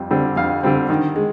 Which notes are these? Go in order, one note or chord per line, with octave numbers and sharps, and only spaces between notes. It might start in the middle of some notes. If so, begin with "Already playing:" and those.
Already playing: F2 G3 C4
D3 G3 C4
F2 F5
D3 G3 C4
D#3
G#3